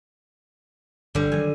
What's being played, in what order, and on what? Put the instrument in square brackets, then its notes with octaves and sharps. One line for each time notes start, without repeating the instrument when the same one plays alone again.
[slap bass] G1 [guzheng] D3 G3
[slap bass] D#3 F3 F#3 [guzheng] G#5